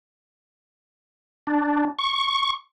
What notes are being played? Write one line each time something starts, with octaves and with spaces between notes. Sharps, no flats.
D4
C#6